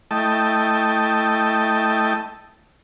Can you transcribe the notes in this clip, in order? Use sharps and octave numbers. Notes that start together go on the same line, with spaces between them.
A3 E4 D#5 G5 A5